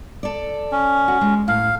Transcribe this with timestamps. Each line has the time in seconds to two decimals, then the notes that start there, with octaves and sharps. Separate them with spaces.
0.23 A4 D5
0.72 C#4
1.08 F#4
1.21 G#3
1.48 A2 F5